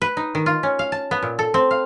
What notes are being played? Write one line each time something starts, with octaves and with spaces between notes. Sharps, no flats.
B4
D#4
D#3
F4
C#4
F5
A5
B3
A#2
A4
C4
F5